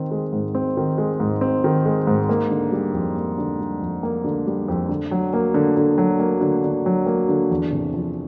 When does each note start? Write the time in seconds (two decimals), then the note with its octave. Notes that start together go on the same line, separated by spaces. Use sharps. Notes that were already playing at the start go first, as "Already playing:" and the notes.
Already playing: D#3 C4
0.11 G#3
0.32 G#2
0.55 C4
0.77 D#3
0.98 G#3
1.20 G#2
1.41 C4
1.64 D#3
1.86 G#3
2.07 G#2
2.29 A#3
2.50 D3
2.72 G3
2.93 F2
3.16 A#3
3.38 D3
3.60 G3
3.81 F2
4.03 A#3
4.24 D3
4.47 G3
4.68 F2
4.89 D3
5.11 F#3
5.33 A#3
5.54 D3
5.77 D3
5.98 F#3
6.19 A#3
6.41 D3
6.64 D3
6.86 F#3
7.06 A#3
7.29 D3
7.51 E2
7.72 C3
7.94 F3